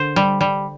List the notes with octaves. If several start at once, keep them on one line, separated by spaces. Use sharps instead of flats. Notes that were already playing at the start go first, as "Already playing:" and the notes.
Already playing: D3 C5
G3
G3